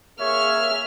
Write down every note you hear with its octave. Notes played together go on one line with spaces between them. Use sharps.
A#3 G#4 C#5 E5 F6